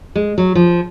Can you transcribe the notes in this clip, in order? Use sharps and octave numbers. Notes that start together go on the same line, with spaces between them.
G#3
F#3
F3